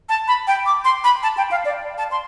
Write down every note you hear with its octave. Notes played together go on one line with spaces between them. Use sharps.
A5
B5
G5
D6
C6
B5
A5
G5
F5
D5
A5
C6